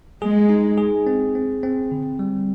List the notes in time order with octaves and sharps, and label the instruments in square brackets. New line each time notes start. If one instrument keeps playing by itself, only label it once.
[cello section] G#3 [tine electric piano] G#4
[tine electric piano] D#4
G#4
C4
C4
C4
D3
G3